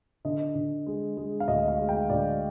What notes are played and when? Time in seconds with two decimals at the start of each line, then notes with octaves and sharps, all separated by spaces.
0.25 D3 D#5
0.55 D3
0.86 G#3
1.17 G#3
1.40 F5
1.48 D2 D#5
1.68 F5
1.79 G#3
1.89 G5
2.10 D2 D5